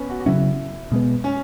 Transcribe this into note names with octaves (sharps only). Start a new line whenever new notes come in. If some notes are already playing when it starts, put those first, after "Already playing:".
Already playing: B3 C#4
F#4
F#4
C#3 F#3 C#4 E4
B2 G#3 B3
C#4